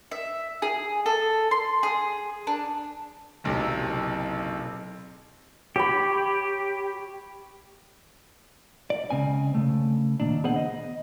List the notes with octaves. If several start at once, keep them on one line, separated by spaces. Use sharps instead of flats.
E5
G#4
A4
C6
G#4
D4
F#1 B1 C3
G4 C#5 B5
D5
C#2 C#3 C4 G#5
C#3 A3
D#2 A#2 D4
B3 G#4 C5 D#5 F#5
D#5